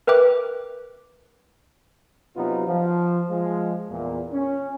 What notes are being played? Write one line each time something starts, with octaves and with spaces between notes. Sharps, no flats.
A#4 B4 E5 G5 D6 F#6
C3 F#3 B3 D#4 F4
F3
F3 G#3
E2 A#2
C#4